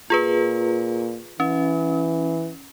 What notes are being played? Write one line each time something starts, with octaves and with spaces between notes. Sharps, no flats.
A#2 F4 G#4 B4
E3 C#4